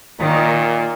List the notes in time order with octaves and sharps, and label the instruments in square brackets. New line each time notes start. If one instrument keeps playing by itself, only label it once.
[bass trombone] A#2 [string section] D#3